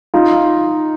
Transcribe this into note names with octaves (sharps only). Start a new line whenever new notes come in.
D#4 F4